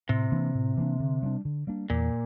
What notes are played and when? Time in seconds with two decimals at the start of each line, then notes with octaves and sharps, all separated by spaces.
0.09 A2 C3
0.32 E3 A#3 D4
0.55 A2
0.77 E3 A#3 D4
1.00 D3
1.22 G3 A#3 D4
1.45 D3
1.67 G3 A#3 D4
1.90 E2 A#2